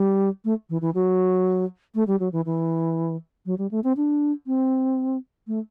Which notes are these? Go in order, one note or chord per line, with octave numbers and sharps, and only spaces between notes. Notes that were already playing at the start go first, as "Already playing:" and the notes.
Already playing: G3
A3
E3
E3
F#3
A3
G3
F#3
E3
E3
F#3
G3
A3
C4
D4
C4
A3